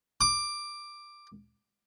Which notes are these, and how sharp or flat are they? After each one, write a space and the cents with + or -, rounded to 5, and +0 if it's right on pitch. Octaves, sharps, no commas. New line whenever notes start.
D6 +10